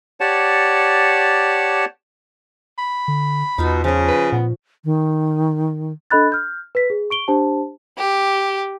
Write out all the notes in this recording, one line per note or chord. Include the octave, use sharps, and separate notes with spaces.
G4 C#5 D5 F#5 A5
B5
D3
E2 B2 D#4 F4 E5
C#3 F3 C#4
B4
A#2 B3
D#3
D4 A4 D#5 B5 F#6 A6
F6 G6
B4 B6
G#4
C#6 D7 G7
D4 G4 C5 A5
G4